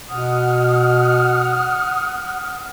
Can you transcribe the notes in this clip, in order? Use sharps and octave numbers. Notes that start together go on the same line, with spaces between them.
B2 F#5 D#6 F6